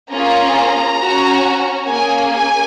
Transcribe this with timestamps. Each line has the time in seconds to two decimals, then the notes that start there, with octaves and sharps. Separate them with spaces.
0.11 A#3 C#4 F4 G#4 A#5
1.00 C#4 F#4
1.87 A#3 C#4 G#4 G#5
2.32 G#5